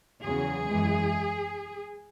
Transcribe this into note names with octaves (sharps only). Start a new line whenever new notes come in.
E2 C#3 F#3 G#4
F#2 E3 G#3